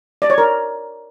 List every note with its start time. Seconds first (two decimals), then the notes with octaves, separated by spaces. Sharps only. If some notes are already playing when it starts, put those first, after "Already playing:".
0.22 D5
0.30 C#5
0.38 A#4